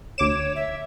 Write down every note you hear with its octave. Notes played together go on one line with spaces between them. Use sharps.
D2 C#5 D6 E7
E5